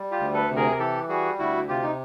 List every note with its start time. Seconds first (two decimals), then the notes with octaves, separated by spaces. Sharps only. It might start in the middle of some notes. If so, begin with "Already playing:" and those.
Already playing: G3
0.11 F4 G4
0.19 D2
0.34 A4 B4
0.49 C3
0.56 G#4 A#4
0.71 A#4
0.79 E3 G4 A4
1.08 G3 F#4 G#4
1.38 D2 E4 F#4
1.68 C3 F4 G4
1.83 D#4